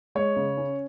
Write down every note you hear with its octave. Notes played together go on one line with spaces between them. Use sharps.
G#3 C#5
C#3
C#4